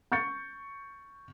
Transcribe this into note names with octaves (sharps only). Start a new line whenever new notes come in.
C#6 G6 A6 C#7